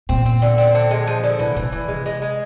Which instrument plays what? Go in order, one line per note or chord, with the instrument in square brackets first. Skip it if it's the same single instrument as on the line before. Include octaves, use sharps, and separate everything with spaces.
[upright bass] A#2 [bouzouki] C4
[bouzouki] C4
D3
C4
D3
G#3
F3
D3
[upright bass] C3 [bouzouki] E3
[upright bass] A#2 [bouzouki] E3
[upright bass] A#2 [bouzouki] E3
[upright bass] C3 [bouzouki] G#3
[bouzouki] G#3
G#3